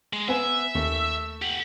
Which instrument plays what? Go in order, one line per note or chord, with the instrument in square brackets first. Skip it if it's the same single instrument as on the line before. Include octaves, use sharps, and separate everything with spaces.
[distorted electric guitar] G#3
[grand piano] B3 B4 G#5 [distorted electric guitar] E5
[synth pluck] D#2 [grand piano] A3
[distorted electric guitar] G4 F#5